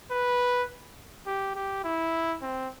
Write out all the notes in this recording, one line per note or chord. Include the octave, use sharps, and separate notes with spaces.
B4
G4
G4
E4
C4